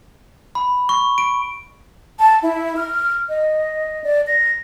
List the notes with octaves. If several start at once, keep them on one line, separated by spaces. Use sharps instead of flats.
B5
C#6
D7
A5
E4
F6
D#5
D5
A#6